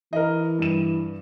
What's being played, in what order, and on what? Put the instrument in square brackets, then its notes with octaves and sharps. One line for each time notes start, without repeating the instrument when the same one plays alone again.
[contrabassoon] E3 [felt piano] A#4 D#5
[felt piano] G2 E7